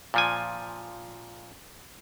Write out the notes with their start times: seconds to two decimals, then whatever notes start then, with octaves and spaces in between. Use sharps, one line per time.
0.14 A#2 F3 G#5